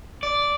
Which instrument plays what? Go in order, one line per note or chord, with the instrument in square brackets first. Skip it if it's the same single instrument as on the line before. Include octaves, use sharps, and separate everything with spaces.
[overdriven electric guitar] D5